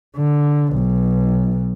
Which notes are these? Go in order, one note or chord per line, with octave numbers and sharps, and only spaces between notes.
D3
B1